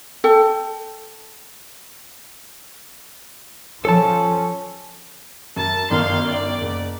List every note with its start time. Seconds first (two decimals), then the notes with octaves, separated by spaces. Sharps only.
0.24 A4 G5
3.85 F3 C#4 A4 A5
5.57 F#2 A5
5.90 G1 F#2 D#3 F5 C6
6.27 D5
6.61 F#1